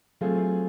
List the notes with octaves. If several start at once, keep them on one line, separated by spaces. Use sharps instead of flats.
F#3 A3 C4 F4 G#4